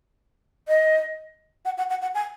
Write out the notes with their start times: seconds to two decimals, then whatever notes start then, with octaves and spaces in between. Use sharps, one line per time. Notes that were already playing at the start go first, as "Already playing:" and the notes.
0.68 D#5
1.65 F#5
1.78 F#5
1.90 F#5
2.02 F#5
2.15 G#5